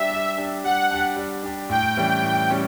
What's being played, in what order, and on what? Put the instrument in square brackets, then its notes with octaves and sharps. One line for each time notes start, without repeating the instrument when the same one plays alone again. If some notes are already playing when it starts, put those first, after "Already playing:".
Already playing: [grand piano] G3 D4 G4 [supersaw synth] E5
[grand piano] G3
D4 G4
[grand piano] G3 [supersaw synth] F#5
[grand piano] D4 G4
G3
D4 G4
[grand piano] A2 [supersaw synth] G5
[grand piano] E3 G3 C#4
A2
G3 C#4